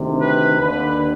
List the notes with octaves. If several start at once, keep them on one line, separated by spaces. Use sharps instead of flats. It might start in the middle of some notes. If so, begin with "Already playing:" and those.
Already playing: D2 C3 D#3
B4
D#2 D3 B4